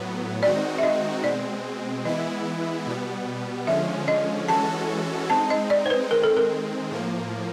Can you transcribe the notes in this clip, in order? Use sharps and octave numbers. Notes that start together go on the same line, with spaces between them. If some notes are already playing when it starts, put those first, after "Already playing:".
Already playing: A2 F#3 B3
D#3 G#3 C4 D#4 F#4 D5
E5
D#5
B2 G#3 C4 D5
E3 G#3 B3 E4 D#5
B2 G3 B3
D3 F3 G#3 C#4 E5
D#5
E3 G#3 C#4 F#4 A4 A5
G#3 C4 D#4 A5
D#5
D5
C5
B4
D#3 G#3 C4 A#4
A4
A#4
A2 F3 A#3